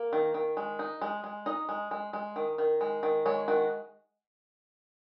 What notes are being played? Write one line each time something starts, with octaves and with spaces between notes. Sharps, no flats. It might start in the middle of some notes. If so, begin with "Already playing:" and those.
Already playing: A#3
D#3
D#3
G#3
D#4
G#3
G#3
D#4 D#5
G#3
G#3
G#3
D#3
D#3
G#3
D#3
G#3 C#5
D#3 F#4